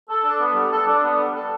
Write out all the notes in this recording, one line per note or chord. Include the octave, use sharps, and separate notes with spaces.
A4
D4
B3
G3
A4
D4
B3
G3
A4